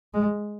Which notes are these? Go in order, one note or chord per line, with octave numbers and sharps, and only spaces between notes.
G#3